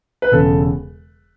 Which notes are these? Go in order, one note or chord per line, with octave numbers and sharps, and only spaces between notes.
B4
E1 E2 C#3 A4